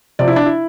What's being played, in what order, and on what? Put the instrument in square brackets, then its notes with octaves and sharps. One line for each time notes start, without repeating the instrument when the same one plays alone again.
[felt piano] C3 F3 D5
E4
D4
E4